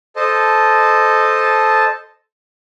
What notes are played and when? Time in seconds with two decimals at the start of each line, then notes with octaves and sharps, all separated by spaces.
0.16 A4 C5 D#5 A5